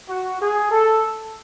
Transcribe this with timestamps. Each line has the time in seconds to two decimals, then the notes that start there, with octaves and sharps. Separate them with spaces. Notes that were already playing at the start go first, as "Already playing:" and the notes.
0.09 F#4
0.41 G#4
0.71 A4